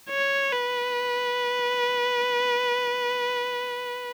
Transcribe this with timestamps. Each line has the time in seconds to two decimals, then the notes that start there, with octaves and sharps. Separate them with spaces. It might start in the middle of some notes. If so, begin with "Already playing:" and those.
0.10 C#5
0.53 B4